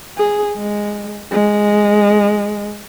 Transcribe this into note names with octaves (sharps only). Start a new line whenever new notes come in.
G#4
G#3
G#3